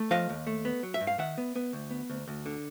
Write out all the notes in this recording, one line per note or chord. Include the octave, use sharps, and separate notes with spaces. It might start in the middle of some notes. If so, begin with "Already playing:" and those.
Already playing: A3
F3 D#5 F5
D#2
A3
B3
F#3
E5
G2
F5
D#3 E5 F#5
B3
B3
D2
B3
D2
D2
D3